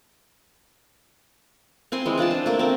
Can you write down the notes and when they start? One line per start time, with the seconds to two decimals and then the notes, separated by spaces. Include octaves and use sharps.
1.92 C4 G#5 C6
2.06 E3 G#3
2.18 D4 F4 D5 A5
2.31 C5
2.46 A3 A#3
2.59 A#3 C4